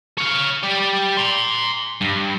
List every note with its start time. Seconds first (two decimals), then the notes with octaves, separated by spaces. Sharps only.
0.18 C#5 F5
0.63 G4 D5
1.18 A#5 C6
2.01 G2